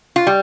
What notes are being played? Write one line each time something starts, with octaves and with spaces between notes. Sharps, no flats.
F4
G3